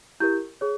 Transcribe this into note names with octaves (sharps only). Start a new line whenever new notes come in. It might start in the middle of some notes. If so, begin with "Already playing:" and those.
E4 G4 A#4 G6
G#4 C#5